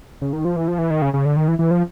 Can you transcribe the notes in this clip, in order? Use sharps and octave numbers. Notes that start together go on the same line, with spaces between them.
C#3
D#3
F3
E3
F3
E3
D#3
C#3
C#3
D3
D#3
E3
E3
F3